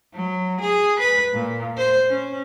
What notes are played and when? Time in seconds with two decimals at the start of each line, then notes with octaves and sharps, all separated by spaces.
0.14 F#3
0.61 G#4
0.99 B4
1.34 A#2
1.77 C5
2.09 C#4